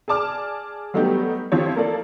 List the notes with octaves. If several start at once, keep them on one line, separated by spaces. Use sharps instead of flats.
G#4 D5 A5 D6 F6
F#3 G3 A3 B3 D#4 G4
F3 C4 E4 G4 C#5
A#3 A4 D5